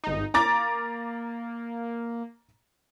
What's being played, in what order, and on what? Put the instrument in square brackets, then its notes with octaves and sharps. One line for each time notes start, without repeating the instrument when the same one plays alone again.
[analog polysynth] G#1 D#4
[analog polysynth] A#3 [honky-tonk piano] A#5 D6 A6